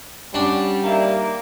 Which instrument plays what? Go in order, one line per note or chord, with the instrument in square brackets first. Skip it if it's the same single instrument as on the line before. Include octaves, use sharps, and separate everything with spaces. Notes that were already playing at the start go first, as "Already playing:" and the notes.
[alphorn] G3 [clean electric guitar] C#4 F#4 [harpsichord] D4
[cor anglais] A#3 [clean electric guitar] D#4 E5